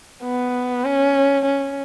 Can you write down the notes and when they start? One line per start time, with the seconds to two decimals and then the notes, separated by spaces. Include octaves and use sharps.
0.24 B3
0.84 C#4
1.45 C#4